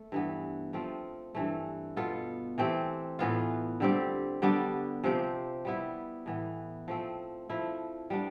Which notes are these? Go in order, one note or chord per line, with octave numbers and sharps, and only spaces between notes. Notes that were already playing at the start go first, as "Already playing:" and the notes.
Already playing: A3
G2 E3 B3
F3 A3 C4 F4
G2 E3 A3
B2 B3 F4 A4
E3 A3 C4 G4
A2 E3 B3 F4
D3 G3 C4 G4
D3 G3 B3 D4
C3 F3 C4 G4
G3 B3 E4
A2 E3 B3
F3 A3 C4
F3 A3 E4
G3 B3 D4